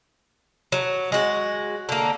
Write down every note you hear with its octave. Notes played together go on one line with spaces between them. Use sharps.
F#3
G#3 F#4
D3 A#3